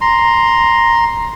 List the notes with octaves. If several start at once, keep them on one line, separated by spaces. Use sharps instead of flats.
A#5 C6